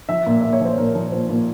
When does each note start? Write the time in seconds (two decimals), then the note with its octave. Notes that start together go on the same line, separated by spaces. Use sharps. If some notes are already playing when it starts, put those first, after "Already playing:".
0.09 F3 E5
0.27 A#2
0.41 A#2 E5
0.53 C#5
0.61 F3 C5
0.78 A#2 A#4
0.95 F3
1.12 A#2 C5
1.29 A#2